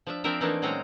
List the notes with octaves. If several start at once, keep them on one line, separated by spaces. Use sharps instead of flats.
F3 D4 E5
F3 C4 D4 F4 A#4 E5
E3 A3 A#3 D4 D#4
A#2 F#3 G#3 C4 C#4 A#5